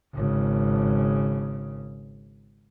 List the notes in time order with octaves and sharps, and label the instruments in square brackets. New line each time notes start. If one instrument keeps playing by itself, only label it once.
[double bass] G#1 C#3